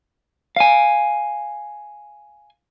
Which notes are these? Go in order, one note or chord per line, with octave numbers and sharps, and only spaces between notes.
F5 G#5